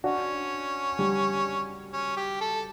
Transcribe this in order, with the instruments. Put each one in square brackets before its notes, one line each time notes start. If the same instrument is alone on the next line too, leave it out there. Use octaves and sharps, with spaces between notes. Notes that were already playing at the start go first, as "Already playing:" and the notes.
[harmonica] C#4 [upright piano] D4 F#4
[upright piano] G3
[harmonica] C#4
G4
A4